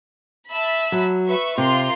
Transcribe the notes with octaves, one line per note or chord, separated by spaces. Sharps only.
E5 A5 B5
F#3
B4 E5 C#6
C3 F4 A#4 C6